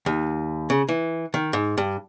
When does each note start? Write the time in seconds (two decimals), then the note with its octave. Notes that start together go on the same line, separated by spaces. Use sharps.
0.06 D#2
0.70 C#3
0.89 E3
1.34 D#3
1.53 G#2
1.78 G2